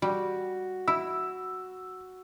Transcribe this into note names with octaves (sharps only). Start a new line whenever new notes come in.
G3 F#4
E4 E6